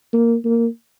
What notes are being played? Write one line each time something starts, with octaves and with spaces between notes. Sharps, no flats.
A#3
A#3